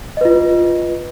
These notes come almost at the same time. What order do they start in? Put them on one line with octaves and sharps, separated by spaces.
D#5 B4 F4